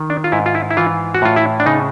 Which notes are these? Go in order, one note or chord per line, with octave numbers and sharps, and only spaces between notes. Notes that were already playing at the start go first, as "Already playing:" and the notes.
Already playing: D#3
D4
F4
G#2 E4
F4
E4
E4
E3 F4
F#4
A2 F4
E4
D4
C#3 D#4